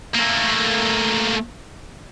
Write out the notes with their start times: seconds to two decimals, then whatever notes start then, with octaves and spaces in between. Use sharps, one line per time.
0.15 A3 A#3